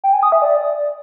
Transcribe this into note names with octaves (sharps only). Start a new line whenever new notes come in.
G5
G#5
D#6
E5
D5